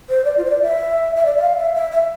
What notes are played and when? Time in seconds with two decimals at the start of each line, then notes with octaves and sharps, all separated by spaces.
0.10 C5
0.25 D5
0.37 F4
0.45 C5
0.50 D5
0.63 E5
1.16 E5
1.25 D5
1.37 E5
1.41 F5
1.58 E5
1.74 E5
1.91 E5